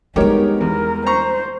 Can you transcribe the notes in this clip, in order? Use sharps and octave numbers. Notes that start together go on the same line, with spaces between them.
G3 G#3 B3 D#4 G4 A#4 C#5
E2 A#4
C5 A#5 C#6